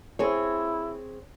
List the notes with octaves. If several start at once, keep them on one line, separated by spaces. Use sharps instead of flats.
C4 E4 G#4 C#5